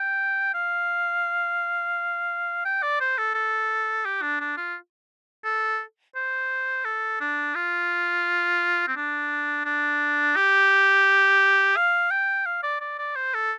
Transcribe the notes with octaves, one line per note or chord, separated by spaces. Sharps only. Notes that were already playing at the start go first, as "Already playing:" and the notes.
Already playing: G5
F5
G5
D5
C5
A4
A4
G4
D4
D4
F4
A4
C5
A4
D4
F4
C4
D4
D4
G4
F5
G5
F5
D5
D5
D5
C5
A4